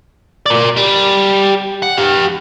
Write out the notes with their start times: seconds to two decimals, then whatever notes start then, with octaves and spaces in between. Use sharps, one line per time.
0.46 A#4 D5
0.77 G3
1.83 F#5
1.98 G4 F5